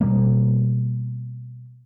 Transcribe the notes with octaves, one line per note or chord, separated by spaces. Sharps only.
B2 G3 A#3